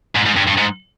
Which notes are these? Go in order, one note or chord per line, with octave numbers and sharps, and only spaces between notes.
G#2
G#2
G2
G2
G#2